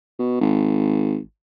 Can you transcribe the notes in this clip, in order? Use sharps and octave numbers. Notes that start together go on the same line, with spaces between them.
B2
G#1